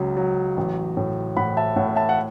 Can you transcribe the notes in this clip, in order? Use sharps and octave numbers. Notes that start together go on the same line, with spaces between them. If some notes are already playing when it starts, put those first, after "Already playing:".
Already playing: C#2 C#3 F#3
F#3
A1
A2
A2 F#5 B5
E5 A5
A2 C#5 F#5
E5 A5
F#5